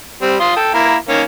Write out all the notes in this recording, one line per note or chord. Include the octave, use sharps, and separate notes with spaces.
G3 C4
F4 C6 D#6
A4 G5
A#3 E4 A#4
D#3 A#3 C#4